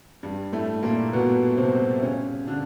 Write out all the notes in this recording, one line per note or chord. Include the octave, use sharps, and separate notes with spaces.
G2 G3
A2 A3
A#2 A#3
B2 B3
C3 C4
C#3 C#4
D3 D4